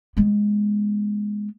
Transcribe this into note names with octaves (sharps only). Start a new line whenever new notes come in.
G#3 B3